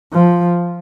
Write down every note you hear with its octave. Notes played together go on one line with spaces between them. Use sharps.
F3